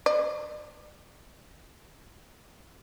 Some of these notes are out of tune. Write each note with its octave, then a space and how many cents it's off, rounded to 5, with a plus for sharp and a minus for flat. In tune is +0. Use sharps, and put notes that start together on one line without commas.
D5 +45